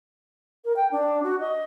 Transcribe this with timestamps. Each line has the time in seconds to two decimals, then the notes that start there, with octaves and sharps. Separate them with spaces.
0.65 A#4
0.76 G5
0.91 D4
1.23 F#4
1.40 D#5